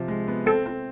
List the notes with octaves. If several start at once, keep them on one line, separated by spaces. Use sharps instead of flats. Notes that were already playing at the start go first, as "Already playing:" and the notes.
Already playing: C3 F3
G#3
B3
C4 A4
C4